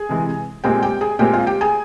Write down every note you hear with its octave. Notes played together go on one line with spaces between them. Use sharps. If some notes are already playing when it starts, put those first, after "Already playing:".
Already playing: G#4 G#5
C3 E3 G#3
A#2 G#3 C4 G4 G5
G4 G5
G#4 G#5
A#2 G#3 C4 G4 G5
F4 F5
G4 G5
G#4 G#5